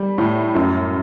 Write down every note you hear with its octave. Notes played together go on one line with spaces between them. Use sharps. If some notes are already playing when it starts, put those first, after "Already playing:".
Already playing: G3
A2
F#2